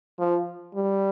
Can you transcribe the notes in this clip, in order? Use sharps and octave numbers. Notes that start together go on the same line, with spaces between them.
F3
G3